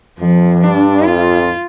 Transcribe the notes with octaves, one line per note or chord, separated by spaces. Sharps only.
F2 F3
G2 D4
F2 F4